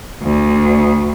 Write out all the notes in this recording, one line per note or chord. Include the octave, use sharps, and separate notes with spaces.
D2